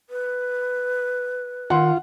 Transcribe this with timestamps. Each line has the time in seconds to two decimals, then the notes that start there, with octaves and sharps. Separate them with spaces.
0.10 B4
1.70 D#3 F4 F#5 C6